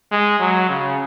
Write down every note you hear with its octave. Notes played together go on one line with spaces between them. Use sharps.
G#3
F#3
C#3